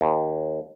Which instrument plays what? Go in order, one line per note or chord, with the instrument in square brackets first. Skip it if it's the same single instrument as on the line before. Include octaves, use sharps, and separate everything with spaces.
[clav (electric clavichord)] D#2